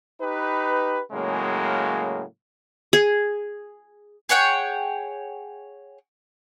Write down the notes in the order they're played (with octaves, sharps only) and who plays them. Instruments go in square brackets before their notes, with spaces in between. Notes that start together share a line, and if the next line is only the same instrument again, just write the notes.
[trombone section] D#4 G4 B4
A2 C#3 F#3 G#3 A#3
[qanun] G#4
[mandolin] G#4 C#5 F#5 G5